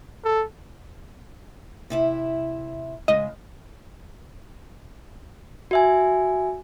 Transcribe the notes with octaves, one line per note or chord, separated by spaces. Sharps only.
A4
C3 E4 E5
C#3 G#3 D#5
F#4 E5 G#5